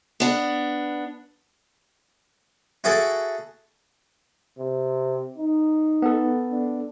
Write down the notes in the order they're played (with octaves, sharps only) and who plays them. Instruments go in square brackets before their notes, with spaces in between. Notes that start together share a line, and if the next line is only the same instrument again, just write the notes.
[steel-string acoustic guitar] B3 D4
[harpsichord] E4 F#4 G#4 A4
[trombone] C3
D#4
[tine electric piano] B3 A4
[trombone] D4